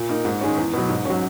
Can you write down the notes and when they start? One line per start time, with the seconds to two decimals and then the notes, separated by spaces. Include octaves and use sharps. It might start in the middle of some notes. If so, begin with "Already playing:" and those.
Already playing: A#2
0.09 A#3 D#4
0.25 G#2
0.41 D#3 G#3 C#4
0.58 E2
0.74 B2 F#3
0.89 G#2
1.05 F#3 C#4